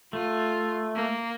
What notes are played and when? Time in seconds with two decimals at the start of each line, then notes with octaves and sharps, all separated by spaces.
0.13 A3 F4
0.95 A#3